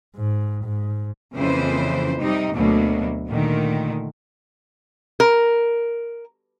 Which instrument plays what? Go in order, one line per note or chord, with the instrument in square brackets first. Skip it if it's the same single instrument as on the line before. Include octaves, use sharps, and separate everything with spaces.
[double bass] G#2
G#2
[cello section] F2 C#3 E3 A#3 B4 C5
C3 G3 D#4
D2 B2 F#3 A#3
A#2 D3 D#3 A3
[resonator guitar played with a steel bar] A#4